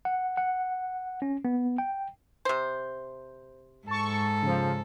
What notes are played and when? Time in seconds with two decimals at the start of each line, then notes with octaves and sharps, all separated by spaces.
0.05 F#5
0.37 F#5
1.22 C#4
1.45 B3
1.78 G5
2.45 C3 C5
3.88 G#2 A4 A5 C#6
4.43 C#3 F3